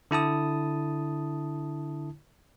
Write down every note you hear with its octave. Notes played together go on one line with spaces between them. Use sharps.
D3 E4 A5 D#6